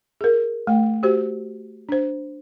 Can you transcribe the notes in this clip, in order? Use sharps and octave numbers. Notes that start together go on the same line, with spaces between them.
G#4 A#4
A3 G5
F#4 G4 C5
D4 C5